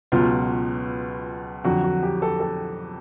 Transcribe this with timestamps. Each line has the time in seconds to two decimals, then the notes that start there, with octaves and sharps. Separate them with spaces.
0.12 C#2 B2 F#3 F4
1.64 F2 D3 F#3 F#4
1.83 F#4
2.03 G4
2.22 A4
2.40 A4